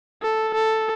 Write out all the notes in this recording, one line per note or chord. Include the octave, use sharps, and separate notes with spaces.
A4
A4